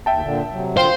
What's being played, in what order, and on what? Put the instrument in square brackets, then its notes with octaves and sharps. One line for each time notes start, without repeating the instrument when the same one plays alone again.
[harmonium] D#2 [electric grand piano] E5 G5 A5
[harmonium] A#2 D3
C3 F#3
[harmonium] D3 F4 [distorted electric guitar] C5 [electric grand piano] F5 G5